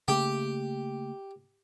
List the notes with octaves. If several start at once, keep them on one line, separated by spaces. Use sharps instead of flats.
C#3 A3 A#3 G4